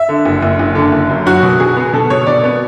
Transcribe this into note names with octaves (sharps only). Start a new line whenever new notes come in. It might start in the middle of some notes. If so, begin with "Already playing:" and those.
Already playing: E5
D3
F#1
F#1
F#1
D3
F#1
F#2
F#3 F#4
B2
B2 G#4
B3
B2 A4
B2 C#5
B2 D5
B3